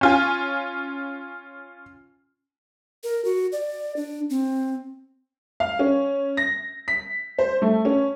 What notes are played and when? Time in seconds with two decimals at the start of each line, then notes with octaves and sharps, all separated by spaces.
0.01 C#4 F4 G#5
3.04 A#4
3.25 F#4
3.52 D5
3.96 D4
4.30 C4
5.60 F5
5.79 C#4
6.37 A#6
6.88 B6
7.39 C5
7.62 A3
7.85 C#4